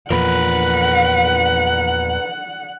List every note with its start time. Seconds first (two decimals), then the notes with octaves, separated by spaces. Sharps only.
0.11 E2 A#2 F3 A#4 B4 F#5